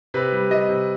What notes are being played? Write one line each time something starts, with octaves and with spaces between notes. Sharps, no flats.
C3 B4
G3
G3 D#5
C3